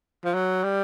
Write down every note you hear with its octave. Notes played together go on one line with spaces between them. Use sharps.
F3
F#3
G3